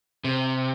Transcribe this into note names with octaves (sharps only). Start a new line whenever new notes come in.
C3